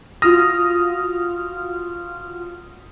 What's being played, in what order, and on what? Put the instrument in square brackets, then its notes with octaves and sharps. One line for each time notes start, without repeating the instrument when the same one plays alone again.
[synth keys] F4 F#4 F6 [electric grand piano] D#6 A#6